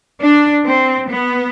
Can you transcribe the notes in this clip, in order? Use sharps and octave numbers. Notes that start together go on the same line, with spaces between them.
D4
C4
B3